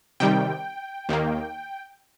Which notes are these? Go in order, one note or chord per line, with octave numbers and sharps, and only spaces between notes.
C3 D#3 G3 G5
D#2 D#3 A#3